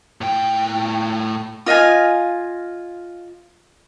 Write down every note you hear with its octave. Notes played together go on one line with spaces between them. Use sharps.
A2 G5
F4 D#5 F5 G#5